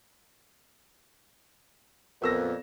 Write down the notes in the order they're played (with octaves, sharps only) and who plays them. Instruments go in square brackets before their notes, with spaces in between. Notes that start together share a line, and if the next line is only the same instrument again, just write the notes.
[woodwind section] F2 A#2 [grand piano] B3 E6 A#6